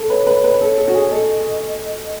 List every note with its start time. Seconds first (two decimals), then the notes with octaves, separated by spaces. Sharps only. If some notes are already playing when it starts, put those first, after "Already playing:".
Already playing: A4
0.10 B4 C#5
0.27 B4
0.44 B4
0.61 A4
0.78 A4
0.88 F#4
0.95 G#4
1.12 A4 D#5